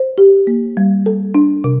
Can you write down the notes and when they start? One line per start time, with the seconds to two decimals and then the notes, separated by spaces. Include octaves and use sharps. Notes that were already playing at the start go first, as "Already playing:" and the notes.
Already playing: C5
0.18 G4
0.47 A#3
0.77 G3
1.06 A4
1.35 D4
1.64 C3